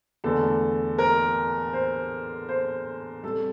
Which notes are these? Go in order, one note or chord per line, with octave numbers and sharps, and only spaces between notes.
E2 D3 A3 A4
A#4
C5
C5
C3 G3 A4